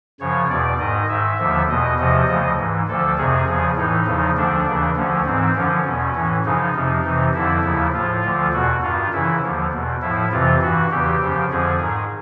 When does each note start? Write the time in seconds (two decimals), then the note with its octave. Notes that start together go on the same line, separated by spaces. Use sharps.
0.20 F#2 C#3 F3 C#5
0.49 E2 B2 D5
0.79 G#2 D#3 D#5
1.09 G#2 D#3 E5
1.39 D#2 D3 F3
1.69 E2 B2 D#5
1.98 E2 C3 F3 D#5
2.28 D2 C#3 F3 D#5
2.58 G#2 E3
2.88 D2 D3 F3 A4
3.17 F2 C3 D#3 G#4
3.47 E2 C#3 F3
3.77 A2 E3 D#4
4.07 E2 C#3 F3
4.36 D2 D3 F3 D4
4.66 D#2 C#3 E3
4.96 D2 D3 F3 C#4
5.26 G#2 E3 C4
5.55 F#2 D3 F3 C#4
5.86 E2 B2
6.15 A2 E3
6.45 F#2 C#3 F3 D#4
6.75 F2 C3 F3
7.05 F2 C3 E3
7.34 F2 D3 F3 E4
7.64 D#2 C#3 F3
7.94 A2 F3 F4
8.24 D2 D3 F3
8.53 E2 B2 F#4
8.83 G2 D#3 F4
9.13 F#2 C#3 E3 E4
9.43 D#2 D3 F3
9.72 E2 B2
10.02 A2 F3 E4
10.32 F2 C3 E3 F4
10.61 G2 E3 F#4
10.91 E2 C#3 E3 G4
11.21 F#2 C#3 F3
11.51 F2 D3 F3 G#4
11.81 G#2 D#3